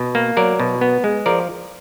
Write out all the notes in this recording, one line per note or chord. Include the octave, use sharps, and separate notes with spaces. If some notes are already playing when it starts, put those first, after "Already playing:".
Already playing: B2
A#3
F#3 A#4 D5
B2
B3
G#3
F3 A#4 D5